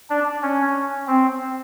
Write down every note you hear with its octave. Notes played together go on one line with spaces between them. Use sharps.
D4
C#4
C4